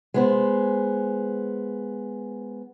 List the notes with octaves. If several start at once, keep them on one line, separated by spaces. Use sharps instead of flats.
G#3 B3 C5